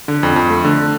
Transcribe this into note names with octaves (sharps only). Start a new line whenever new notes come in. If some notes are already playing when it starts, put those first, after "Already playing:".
D3
F2
F2
A3
D3